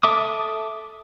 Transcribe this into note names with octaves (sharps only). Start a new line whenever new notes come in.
A4 E5 D6 D#6